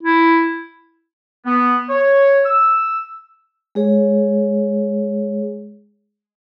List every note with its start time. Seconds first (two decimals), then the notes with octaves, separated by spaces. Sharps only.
0.03 E4
1.45 B3
1.89 C#5
2.45 E6
3.75 G#3 G#4 C#5